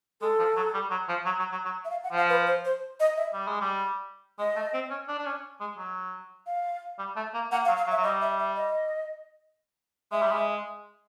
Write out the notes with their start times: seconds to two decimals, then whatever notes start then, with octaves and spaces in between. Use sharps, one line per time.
0.21 G#3 A4
0.39 F3
0.57 F#3
0.74 G3
0.91 F#3
1.09 F3
1.26 F#3
1.39 F#3
1.52 F#3
1.65 F#3
1.85 E5
1.90 F5
2.04 F#5
2.12 F3 F5
2.29 B4
2.47 C5
2.65 C5
3.00 D#5
3.17 E5
3.34 G3
3.48 G#3
3.61 G3
4.39 G#3 D#5
4.56 A3
4.74 C4
4.90 C#4
5.08 D4
5.18 D4
5.26 C#4
5.60 G#3
5.78 F#3
6.46 F5
6.99 G3
7.16 A3
7.34 A#3
7.52 A#3 F#5
7.65 F5
7.68 F#3
7.77 F5
7.87 F#3
7.91 E5
7.97 F#3
8.03 G3 D#5
8.22 E5
8.39 E5
8.56 D#5
10.12 G#3 E5
10.22 G3
10.32 G#3